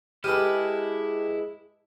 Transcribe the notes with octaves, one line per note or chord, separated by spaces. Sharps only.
G#3 E4 G4 A4 B4 F6 D#7